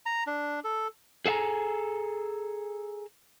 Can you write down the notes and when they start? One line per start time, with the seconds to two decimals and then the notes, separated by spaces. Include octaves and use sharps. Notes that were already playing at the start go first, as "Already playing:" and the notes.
0.06 A#5
0.27 D4
0.64 A4
1.26 G#4 A4 F5 G#5 A#5